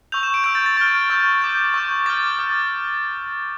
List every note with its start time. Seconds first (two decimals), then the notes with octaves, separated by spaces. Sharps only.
0.12 C#6 E6 G6 F7
0.23 E7
0.34 D7
0.44 C#6 E6 G6 D7
0.55 A6
0.66 A6
0.77 C#6 F6 A6
1.10 C#6 E6 G6
1.42 D6 G6
1.74 C#6 E6 G6
2.06 D6 F6 A6
2.39 D6 F6